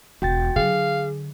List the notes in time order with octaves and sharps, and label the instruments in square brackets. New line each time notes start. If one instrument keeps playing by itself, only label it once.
[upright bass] E1 [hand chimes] F#4 G5 A6
[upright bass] D3 F#3 [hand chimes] G#4 [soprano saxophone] F5